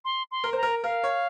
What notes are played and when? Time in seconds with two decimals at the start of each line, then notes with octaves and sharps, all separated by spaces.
0.05 C6
0.31 C6
0.44 A#4
0.53 C5 A#5
0.63 A#4
0.84 A#4 F5
1.04 C#5